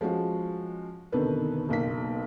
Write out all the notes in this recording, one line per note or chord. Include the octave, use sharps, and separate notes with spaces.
F3 G#3 C#4 F#4
F1 B2 D3 D#3 A4 B4
F#1 B1 A#3 B6